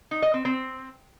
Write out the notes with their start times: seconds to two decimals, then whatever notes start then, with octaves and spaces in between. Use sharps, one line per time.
0.11 D#4
0.22 D#5
0.34 C4
0.45 C4